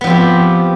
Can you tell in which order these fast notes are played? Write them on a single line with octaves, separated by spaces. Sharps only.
B3 F3 C4 G4